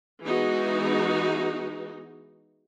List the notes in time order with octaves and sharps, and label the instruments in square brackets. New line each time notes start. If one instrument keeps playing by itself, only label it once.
[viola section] E3 G#3 B3 D#4 F#4